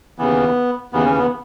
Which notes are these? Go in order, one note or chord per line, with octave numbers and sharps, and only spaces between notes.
D#2 C#3 E3 B3
D#2 C#3 E3 B3
C#4
B3